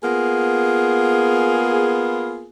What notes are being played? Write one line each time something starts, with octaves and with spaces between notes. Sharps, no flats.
A#3 B3 F4 G#4